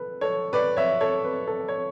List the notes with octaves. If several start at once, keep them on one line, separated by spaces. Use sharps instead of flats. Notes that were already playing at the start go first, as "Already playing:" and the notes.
Already playing: A4 B4
A4 C#5
B4 D5
C#5 E5
A4 C#5
B4
A4
C#5